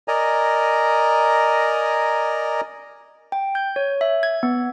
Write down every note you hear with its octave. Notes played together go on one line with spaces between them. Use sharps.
A#4 D5 D#5 G#5 A#5
G5
G6
C#5
E5
G#6
B3